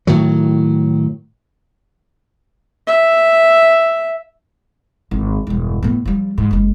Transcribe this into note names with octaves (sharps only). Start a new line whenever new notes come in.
A2 D#3 F#3
E5
G#1
E1 G2
A2 B3
F3 G3
G#2
F#1 G#3